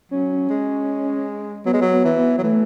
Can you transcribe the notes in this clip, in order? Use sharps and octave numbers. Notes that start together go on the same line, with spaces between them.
F#3 C#4
G#3
F#3 B3
G#3
F#3
B3
E3
B3
F#3
E3 A3